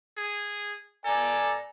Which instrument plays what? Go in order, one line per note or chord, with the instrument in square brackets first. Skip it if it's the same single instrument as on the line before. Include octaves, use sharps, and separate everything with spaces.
[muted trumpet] G#4
[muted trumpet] A4 [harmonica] D5 G#5 A#5